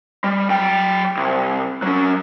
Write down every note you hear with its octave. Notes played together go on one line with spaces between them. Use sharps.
G3
F#3 G5
C2
F#3 C#4